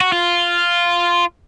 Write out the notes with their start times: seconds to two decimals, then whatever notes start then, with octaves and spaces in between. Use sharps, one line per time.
0.01 F#4
0.12 F4